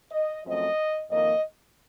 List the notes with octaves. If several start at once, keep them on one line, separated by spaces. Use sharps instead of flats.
D#5
F#2 F3 A3 C4 D#5
F2 D#3 A#3 D#5